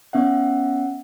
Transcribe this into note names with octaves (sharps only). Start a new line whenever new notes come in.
B3 C#4 E5 F#5